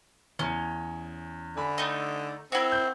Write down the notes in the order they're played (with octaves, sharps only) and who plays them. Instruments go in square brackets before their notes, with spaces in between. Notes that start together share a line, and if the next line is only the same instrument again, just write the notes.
[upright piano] E2 [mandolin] C#4
[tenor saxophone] D3 [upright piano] G#5 B5
[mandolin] A3 D#4
[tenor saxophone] C4 [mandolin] E4 F#4
[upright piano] G6